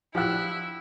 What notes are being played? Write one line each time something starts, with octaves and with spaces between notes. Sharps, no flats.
F3 E4 G4 F#5 E6 F#6